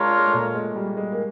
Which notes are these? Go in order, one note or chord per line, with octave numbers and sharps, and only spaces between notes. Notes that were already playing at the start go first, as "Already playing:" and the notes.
Already playing: G#3 D4 F4 A#4 C#5
G#3
A3
A#2 A#3
G#3
G3
G#3
A#3